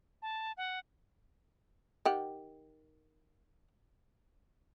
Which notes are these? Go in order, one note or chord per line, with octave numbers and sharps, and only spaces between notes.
A5
F#5
D#3 G4 F#5